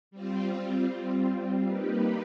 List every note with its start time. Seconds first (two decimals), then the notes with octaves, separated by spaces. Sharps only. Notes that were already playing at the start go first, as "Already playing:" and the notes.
0.11 G3 C4 F4
1.65 G3 A#3 D#4 G4 B4